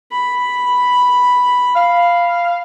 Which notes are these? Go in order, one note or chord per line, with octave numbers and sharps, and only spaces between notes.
B5
F5